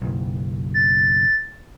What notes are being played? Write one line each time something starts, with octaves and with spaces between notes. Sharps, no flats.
F#1 B1
A6